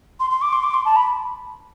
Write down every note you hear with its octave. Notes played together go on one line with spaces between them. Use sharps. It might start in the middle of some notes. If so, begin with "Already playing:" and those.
C6
C6
D6
C6
D6
C6
A5
B5